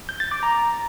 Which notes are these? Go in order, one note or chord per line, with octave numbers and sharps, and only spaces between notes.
G6
A6
D6
A#5